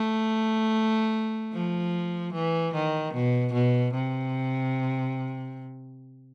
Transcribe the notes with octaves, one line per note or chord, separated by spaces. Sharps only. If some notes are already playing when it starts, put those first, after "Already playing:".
Already playing: A3
F3
E3
D#3
B2
B2
C3